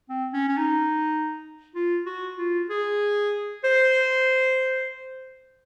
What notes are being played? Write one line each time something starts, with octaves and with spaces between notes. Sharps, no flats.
C4
C#4
C#4
D#4
F4
F#4
F4
G#4
C5